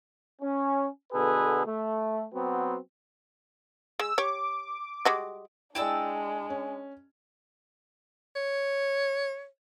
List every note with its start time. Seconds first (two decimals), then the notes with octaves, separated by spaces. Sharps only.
0.42 C#4
1.13 B2 D3 G#4 A4 B4
1.66 A3
2.33 F#3 B3 C4
3.99 G#3 E6
4.18 G4 C#5 D6
5.05 G3 G#3 F#4
5.75 G#3 D4 E4 D5 G5 A5 E6
6.50 C#4
8.35 C#5